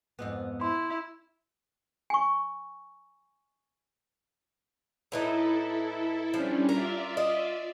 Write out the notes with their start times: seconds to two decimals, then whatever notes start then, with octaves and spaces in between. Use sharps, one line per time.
0.19 F2 G#2 B3
0.61 E4 C6
2.10 G#5 C#6
5.12 A2 E3 D#4 E4 A4
6.34 F3 G3 C#4 D4
6.69 F4 A#4 D5 E5
7.17 D#5